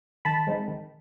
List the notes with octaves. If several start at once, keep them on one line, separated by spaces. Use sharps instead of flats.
D#3 A5 B5
G#3 C4 D#4
D#3